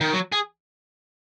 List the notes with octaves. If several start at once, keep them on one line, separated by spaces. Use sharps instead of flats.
D#3
F#3
G#4